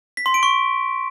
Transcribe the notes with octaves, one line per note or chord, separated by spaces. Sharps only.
B6
C6
D7
C#6